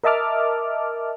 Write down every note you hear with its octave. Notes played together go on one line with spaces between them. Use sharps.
A#4 D#5 E5 A5 D6 F6